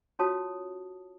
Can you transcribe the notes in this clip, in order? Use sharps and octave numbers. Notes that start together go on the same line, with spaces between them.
C#4 F4 F#4 C#5 A5 D#6